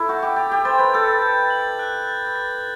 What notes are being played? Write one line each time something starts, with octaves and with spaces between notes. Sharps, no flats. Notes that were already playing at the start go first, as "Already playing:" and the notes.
Already playing: E4 A4
F#4 G6
G4
G4 A6
G4
C5 A6
B4
A4 G6
G6
F#7
F#6
A6
A6